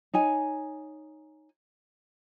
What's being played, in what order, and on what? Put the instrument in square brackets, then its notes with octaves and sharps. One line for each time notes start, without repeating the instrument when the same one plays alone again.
[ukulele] D#4 C#5 G#5